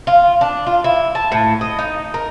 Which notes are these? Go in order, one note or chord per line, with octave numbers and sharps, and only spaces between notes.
F4
D4
F4
E4
A5
A2
D#5
D#4
A#4